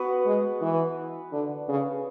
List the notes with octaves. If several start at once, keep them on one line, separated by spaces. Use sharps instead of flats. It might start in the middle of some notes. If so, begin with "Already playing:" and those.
Already playing: B3 F#4 B4
G#3
E3
D3
C#3